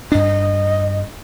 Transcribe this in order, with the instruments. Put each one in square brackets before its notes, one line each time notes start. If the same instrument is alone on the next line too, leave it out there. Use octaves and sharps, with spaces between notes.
[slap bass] G2 D4 [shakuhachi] D#5